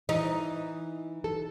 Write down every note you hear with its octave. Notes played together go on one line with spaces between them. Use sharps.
E3 D#4
A4